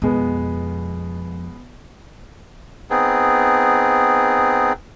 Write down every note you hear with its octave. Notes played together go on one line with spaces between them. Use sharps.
F2 B2 G#3 B3
B3 C4 D#4 G#4